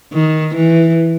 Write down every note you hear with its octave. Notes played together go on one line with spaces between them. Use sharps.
D#3
E3